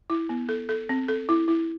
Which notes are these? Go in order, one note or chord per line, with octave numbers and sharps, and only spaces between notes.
E4
B3
A4
A4
C4
A4
E4
E4